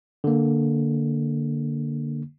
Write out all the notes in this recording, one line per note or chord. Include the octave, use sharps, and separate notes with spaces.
D3 A#3